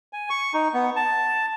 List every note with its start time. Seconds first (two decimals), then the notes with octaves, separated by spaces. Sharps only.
0.13 G#5
0.30 C#6
0.54 D#4
0.74 B3
0.96 A5